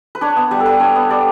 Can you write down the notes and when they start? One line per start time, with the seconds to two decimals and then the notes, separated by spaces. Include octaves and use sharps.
0.15 B4
0.21 D4 C#5
0.36 B3
0.51 G3
0.60 A4
0.66 G3 B4
0.80 D4 C#5
0.96 B3
1.10 G3 D5